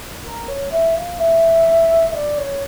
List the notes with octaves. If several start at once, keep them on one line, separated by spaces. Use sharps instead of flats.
A#4
C#5
E5
F5
E5
E5
D5
C#5